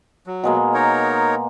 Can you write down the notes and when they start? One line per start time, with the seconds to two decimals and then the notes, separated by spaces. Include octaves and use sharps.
0.27 F#3
0.44 B2 G#3 A#3
0.74 D#4 A#4 C#5